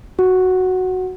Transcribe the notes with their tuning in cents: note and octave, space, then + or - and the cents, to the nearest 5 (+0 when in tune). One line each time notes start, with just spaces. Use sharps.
F#4 +0 F#5 +0